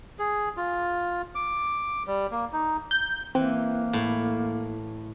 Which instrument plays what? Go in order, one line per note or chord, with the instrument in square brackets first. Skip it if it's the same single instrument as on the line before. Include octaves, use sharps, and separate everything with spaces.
[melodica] G#4
F4
D6
G3
A#3
D#4
[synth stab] G6
[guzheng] E3 [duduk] A#3 [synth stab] C4
[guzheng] A2